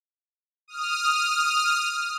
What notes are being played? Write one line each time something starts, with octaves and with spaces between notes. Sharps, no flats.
D#6 F6